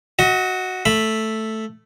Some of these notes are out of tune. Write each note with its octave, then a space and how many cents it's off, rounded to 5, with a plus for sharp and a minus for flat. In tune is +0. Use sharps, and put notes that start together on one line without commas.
F#4 +0 D#5 +40
A3 +0 B5 +0